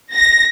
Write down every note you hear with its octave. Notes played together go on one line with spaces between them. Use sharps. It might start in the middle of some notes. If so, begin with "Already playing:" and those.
A#6